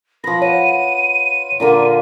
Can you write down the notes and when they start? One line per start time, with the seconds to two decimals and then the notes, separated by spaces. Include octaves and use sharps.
0.24 F3 B4 A#6
0.42 C#5 F#5 D#7
1.60 A#2 D3 A#3